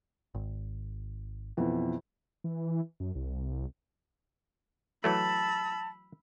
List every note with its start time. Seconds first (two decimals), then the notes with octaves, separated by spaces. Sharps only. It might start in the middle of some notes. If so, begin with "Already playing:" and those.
0.35 G#1
1.57 F2 B2 E3
2.44 E3
3.00 F#2
3.15 C2
5.04 E3 F#3 A3 A5 B5 E6